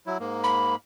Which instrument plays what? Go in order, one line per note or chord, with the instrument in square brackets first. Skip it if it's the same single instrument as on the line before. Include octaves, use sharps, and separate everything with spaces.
[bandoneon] F#3 E4
G#2 A#3
[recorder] B5